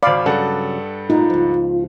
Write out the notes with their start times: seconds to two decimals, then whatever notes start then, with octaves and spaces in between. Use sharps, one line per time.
0.03 G#1 D5 F5 B5
0.26 G2 C#3 F#3 A4 F#5
1.10 A2 D#4 F4
1.30 C#2 F3